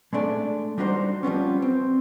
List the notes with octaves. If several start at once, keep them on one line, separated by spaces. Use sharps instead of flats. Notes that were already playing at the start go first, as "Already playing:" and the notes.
G#3 A3 D4 D5
G3 D4 D#4 F#4 B4 C5
F3 G3 B3 C#4
C4